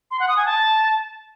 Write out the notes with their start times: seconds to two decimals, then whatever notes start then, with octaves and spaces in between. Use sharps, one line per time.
0.11 C6
0.20 F#5
0.28 D#6
0.37 G#5
0.46 A5